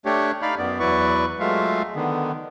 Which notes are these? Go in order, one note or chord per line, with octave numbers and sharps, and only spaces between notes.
A3 D4 G4 C#5
D#4 D5 F5 B5 F6
F#2 B3 D5
E2 F#3 E4 B4 D5 C#6
F#3 G#3 A3 F4 E5 F5
D3 D#3 B3